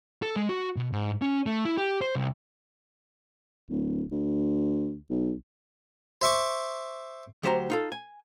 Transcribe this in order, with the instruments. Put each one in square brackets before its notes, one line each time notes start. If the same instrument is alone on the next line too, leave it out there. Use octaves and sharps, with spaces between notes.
[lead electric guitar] A4
G#3
F#4
B2
G#2
C#4
A3
E4
G4
C5
C2
[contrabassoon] D1
D2
B1
[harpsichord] C5 E5 C#6 D6
[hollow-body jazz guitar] D2 F#3 G4 C5 D#5 A#5
D#4 F4 A4
G#5